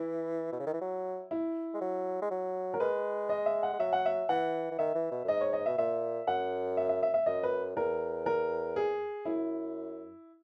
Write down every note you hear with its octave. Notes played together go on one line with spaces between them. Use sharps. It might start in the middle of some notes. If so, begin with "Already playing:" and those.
Already playing: E3 E4
B2
C#3
D#3
E3
F#3
E4
G#3
F#3
G#3
F#3
A#4
G#3 B4
D#5
E5
F#5
G#3
F#3 E5
F#5
E5
E3 F#5
E3
D#3 E5
E3
B2
F#2
G#2 D#5
C#5
D#5
B2 E5
A#2 E5
F#2 F#5
E5
E5
E5
E5
F#2 D#5
B4
E2 A#4
A#4
G#4
F#2 E4